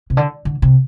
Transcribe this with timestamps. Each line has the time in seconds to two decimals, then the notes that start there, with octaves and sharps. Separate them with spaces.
0.10 C3
0.17 D3
0.45 D3
0.62 C3